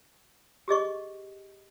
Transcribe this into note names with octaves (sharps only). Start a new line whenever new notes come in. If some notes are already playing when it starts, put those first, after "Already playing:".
G4 G#4 D#5 C#6